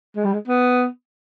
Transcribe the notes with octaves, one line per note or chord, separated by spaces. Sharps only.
G#3
G3
G#3
B3